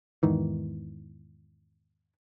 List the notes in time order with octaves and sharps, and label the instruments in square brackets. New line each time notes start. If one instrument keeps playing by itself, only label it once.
[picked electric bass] E2 G#2 D#3 E3